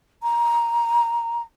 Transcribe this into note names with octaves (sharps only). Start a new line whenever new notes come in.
A#5